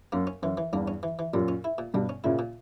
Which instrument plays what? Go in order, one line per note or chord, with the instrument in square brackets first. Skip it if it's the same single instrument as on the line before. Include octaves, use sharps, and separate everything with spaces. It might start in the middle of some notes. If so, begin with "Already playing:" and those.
[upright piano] F#2 [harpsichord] A#3
[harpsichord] C#4
[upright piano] F#2 [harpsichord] E3
[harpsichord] E3
[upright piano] E2 G2 [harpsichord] A#3
[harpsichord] C#4
E3
E3
[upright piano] F#2 A#2 [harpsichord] G3
[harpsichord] C#4
E4
A#2
[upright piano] G2 B2 [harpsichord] G3
[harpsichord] C#4
[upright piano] A#2 C#3 [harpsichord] E4
[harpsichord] A#2